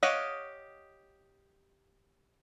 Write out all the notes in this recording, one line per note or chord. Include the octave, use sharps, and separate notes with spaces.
G4 C#5 D#5 F5 F#5